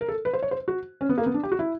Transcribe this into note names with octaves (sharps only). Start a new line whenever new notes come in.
A#4
A4
B4
C5
C#5
C5
F#4
C#4
B3
A#3
B3
D4
G4
F#4
E4